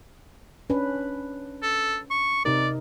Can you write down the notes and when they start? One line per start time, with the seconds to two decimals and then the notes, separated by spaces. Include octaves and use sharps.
0.70 C#4 D4 B4
1.63 A4
2.11 C#6
2.45 C3 D#4 A#4 D5